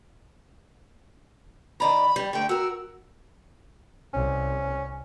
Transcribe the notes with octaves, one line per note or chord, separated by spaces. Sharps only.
D#3 D5 A#5 B5
G3
D3 A3 G5
F#4 A#4 E6
C2 C#4